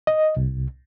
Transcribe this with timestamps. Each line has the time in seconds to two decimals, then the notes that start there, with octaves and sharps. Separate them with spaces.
0.07 D#5
0.37 C2